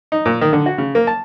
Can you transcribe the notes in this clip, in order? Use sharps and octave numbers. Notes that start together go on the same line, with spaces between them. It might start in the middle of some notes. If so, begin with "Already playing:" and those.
D#4
A#2
D#3
D3
F#4
C#3
A#3
A5